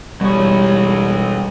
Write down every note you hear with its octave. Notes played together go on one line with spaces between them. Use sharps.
E1 B2 G3 C#5